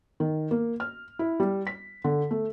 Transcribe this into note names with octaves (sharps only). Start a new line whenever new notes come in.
D#3
A#3
F6
E4
G3
B6
D3
A3